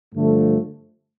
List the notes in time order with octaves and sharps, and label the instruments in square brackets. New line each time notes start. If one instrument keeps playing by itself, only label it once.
[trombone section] G2 D3 F3 A3